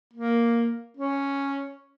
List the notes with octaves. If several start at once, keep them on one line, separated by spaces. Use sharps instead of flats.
A#3
C#4